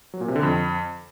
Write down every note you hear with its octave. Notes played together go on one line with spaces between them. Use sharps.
F#3
A#2
C3
D3
F2